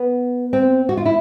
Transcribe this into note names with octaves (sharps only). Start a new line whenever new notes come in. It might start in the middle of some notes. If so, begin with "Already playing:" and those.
Already playing: B3
C4
F#4
F4
E4